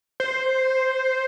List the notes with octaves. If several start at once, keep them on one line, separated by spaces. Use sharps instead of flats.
C5